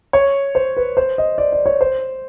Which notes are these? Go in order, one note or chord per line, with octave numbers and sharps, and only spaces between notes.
C#5
C5
B4
C5
D#5
D5
D5
C#5
C5